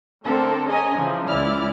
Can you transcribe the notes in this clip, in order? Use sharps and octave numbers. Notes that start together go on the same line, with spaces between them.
D3 A3 C4 A4 A#4
C#4 G#4 D#5 G#5 A#5
C#3 E3 F3
C#2 E3 E4 D5 F6